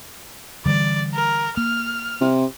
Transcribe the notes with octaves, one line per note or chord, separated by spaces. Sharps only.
D3 E3 G3 D5
A#4
A#3 F6
C3